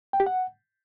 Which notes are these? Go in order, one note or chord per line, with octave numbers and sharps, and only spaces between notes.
G5
G4
F#5